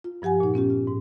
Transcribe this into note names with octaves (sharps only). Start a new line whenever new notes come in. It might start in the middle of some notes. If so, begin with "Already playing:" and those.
F4
G2 F3 G4 F#5 G#5
A#2 D#4
B3 C#4 F4 G4
F4
G#2